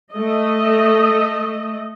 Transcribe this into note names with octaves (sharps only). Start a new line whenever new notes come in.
A3 D#5